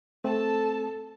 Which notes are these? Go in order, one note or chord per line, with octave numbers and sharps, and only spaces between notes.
A3 C4 A4 A5